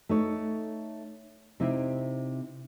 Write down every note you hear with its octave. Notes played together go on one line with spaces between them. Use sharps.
A3 D#4 C#5
C3 C4 D#4 E4